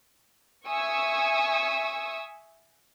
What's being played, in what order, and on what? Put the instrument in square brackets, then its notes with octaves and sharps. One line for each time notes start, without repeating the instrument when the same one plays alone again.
[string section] E5 G#5 C#6 D#6 E6